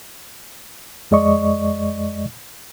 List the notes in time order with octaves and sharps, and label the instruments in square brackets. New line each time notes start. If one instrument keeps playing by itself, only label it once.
[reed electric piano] F2 G#3 D5 D#5 C#6